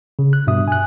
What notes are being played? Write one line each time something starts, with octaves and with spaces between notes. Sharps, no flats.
C#3
F#6
G2 B2 E5 D#6
G#5 F#6